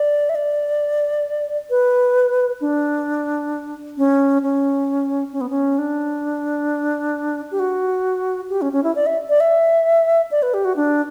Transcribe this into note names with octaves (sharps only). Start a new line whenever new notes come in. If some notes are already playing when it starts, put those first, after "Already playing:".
Already playing: D5
E5
D5
B4
D4
C#4
C#4
C#4
B3
C#4
D4
G4
F#4
G4
C#4
C#4
E4
D5
E5
D5
E5
D5
B4
G4
F#4
D4